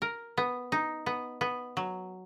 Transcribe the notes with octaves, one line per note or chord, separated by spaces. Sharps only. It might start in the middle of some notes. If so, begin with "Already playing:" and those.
A#4
B3
D#4
B3
B3
F#3